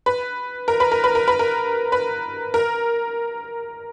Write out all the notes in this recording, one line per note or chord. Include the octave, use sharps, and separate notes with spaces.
B4
A#4
B4
A#4
B4
A#4
B4
A#4
B4
A#4